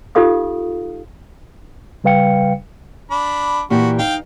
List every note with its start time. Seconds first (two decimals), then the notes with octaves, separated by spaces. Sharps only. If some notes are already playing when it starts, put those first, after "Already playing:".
0.15 D#4 F4 G4 A4 F5 D#6
2.04 C#3 G3 B4 F5 G5 C#7
3.11 D4 B5
3.70 A#2 E3 F#4 G4
3.99 D#4 F5 G5